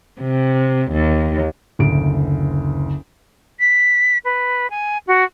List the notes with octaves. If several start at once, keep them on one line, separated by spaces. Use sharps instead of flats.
C3
D#2
F#1 D2 D7
B6
B4
G#5
F#4